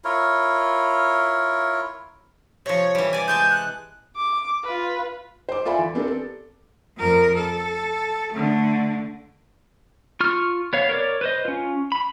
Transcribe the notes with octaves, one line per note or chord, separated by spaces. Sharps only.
E4 F4 A#4 C#5
C3 F3 C#5
E3 G3
D5 G#5
G#3 G#5 A5 G6
F#6
D6
F4 B4
C5 D6
F4 A4 D5 E5 G#5 B5
E2
B3 C4 D4 G4 A4 A#4
A4
F2 A#4
A4
D3 A3
F4 C#6 F6
B3 C#5 F5
A#4 C#5 D5
B4 C5 D#5
C#4 F4
B5